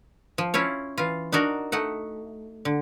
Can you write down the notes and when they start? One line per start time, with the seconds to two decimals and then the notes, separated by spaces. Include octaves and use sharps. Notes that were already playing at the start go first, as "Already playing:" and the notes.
0.38 F3
0.54 C#4 E4 F4 C#5
0.98 E3 F4
1.32 D4 D#4 F#4 A#4
1.72 A3 D#4 F#5
2.65 D3